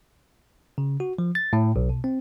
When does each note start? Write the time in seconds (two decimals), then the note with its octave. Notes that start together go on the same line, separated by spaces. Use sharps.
0.78 C#3
1.00 F#4
1.19 F3
1.35 A6
1.53 A2
1.76 B1
1.89 B2
2.04 C4